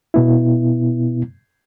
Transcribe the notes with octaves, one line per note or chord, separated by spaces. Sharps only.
B2 B3 E4